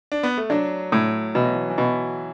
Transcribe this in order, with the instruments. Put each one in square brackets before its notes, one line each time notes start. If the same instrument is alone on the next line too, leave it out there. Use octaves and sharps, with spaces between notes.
[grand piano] D4
B3
A3
[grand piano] F#3 [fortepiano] D4
[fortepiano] A2
[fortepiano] B2 [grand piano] E3
[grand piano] F#3
E3
E3
[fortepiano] B2 [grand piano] F#3